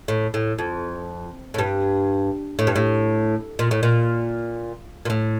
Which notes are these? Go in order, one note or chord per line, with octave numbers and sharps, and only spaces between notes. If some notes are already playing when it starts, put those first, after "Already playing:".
A2
A2
F2
A2
G2
A2
G2
A2
A#2
A2
A#2
A#2
A2